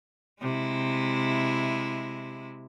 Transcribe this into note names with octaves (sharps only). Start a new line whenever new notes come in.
C3 G#3 E4